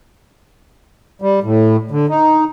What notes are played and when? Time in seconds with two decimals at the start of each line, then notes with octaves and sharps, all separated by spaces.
1.22 G3
1.43 A2
1.91 D3
2.09 D#4